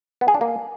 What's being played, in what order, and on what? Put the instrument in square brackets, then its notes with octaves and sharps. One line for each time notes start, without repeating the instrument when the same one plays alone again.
[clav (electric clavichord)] B3
G#4
D4
A#3